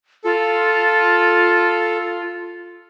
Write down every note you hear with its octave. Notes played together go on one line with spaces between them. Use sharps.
F4 A4